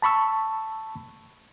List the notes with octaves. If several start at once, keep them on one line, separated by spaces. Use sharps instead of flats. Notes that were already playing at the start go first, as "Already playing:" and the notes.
A5 B5 C#6 E6